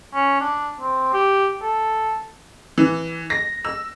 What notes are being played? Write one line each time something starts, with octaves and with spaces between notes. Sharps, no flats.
C#4
D4
C4
G4
A4
E3
A#6
E6